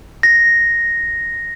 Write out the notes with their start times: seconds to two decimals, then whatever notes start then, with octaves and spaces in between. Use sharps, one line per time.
0.23 A#6